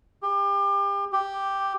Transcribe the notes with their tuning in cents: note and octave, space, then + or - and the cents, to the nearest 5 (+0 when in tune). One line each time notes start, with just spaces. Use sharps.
G4 +30
G4 +0